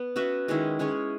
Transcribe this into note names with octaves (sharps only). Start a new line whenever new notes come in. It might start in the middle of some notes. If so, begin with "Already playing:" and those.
Already playing: B3
C#4 F#4 B4 E5
D#3 G#3 C#4 E4
G#3 C#4 G#4 C#5